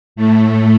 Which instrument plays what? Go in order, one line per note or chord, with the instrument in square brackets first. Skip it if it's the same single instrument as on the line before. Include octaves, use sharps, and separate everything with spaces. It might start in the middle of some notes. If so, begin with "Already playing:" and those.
[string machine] A2 A3